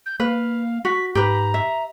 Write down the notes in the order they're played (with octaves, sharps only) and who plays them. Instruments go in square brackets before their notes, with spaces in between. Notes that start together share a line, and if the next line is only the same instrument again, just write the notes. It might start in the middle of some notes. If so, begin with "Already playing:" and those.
[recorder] G6
[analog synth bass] A#3 [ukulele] B4 [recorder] F5
[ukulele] F#4 [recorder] B6
[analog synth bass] G#2 [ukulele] G4 B4 [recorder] A#5
[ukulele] E5